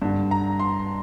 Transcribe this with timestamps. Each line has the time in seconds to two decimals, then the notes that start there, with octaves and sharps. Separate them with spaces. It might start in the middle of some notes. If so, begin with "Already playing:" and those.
0.02 G2 D3
0.31 A#5
0.59 C6